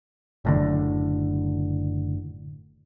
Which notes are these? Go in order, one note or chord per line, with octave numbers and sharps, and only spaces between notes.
F#1 A2 D3